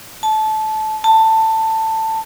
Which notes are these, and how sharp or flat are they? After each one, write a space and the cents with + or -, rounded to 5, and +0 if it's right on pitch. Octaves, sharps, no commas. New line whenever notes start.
A5 -20
A5 +15